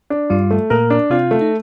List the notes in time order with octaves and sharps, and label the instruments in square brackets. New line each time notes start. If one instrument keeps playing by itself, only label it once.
[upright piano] D4
[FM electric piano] G2 G3 [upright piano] F4
[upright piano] A3
[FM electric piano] A#2 A#3 [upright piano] A#4
[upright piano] D4
[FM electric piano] C3 C4 [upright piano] F4
[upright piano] A3
[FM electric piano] D#4